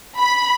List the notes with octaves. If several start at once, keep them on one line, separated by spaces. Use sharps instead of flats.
B5